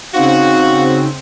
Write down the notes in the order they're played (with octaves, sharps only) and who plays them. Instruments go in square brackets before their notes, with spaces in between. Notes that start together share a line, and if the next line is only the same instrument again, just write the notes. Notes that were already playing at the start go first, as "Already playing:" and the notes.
[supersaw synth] C#3 C4 [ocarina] D#4 [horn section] F#4 [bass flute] F5